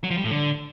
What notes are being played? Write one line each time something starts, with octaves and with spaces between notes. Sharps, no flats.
F#3
F3
G3
A2
D3